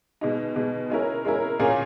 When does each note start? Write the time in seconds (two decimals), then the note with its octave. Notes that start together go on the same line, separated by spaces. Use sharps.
0.21 B2 G#3 D#4
0.56 B2 G#3 D#4
0.90 G#3 C#4 E4 A#4
1.25 G#3 C#4 E4 A#4
1.60 A#2 A#3 C#4 G#4